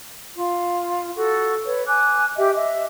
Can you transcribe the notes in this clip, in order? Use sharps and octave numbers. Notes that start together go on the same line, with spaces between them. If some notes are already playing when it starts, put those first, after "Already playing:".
F4
F#4 A4
B4 C#5
G#5 D6 F#6
G4 D#5 E5
D#5 E5